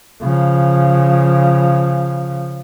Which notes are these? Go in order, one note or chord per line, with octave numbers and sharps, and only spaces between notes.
C#3 F3